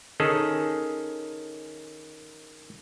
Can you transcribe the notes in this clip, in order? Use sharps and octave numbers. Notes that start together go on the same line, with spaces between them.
D#3 C#4 G#4 A4